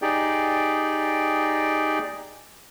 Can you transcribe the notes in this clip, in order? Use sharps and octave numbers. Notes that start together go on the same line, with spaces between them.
D#4 G4 G#4 D5 G5